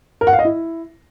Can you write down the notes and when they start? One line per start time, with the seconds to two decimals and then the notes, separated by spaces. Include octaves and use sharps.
0.21 A#4
0.27 F#5
0.33 F5
0.39 D#5
0.45 E4